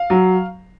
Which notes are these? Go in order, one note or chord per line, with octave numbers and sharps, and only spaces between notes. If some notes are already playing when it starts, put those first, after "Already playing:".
Already playing: F5
F#3